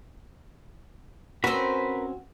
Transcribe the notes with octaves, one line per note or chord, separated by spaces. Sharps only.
C4 C#4 F#4 A#4 B4 B5